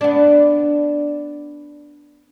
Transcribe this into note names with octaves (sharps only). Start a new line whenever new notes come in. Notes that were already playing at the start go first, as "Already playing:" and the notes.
B3 D4